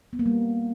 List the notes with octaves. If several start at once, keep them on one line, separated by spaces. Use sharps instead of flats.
B3
A#3
G3